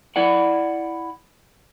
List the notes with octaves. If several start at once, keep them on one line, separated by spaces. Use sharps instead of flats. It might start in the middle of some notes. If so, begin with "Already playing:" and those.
E4 D5 F#5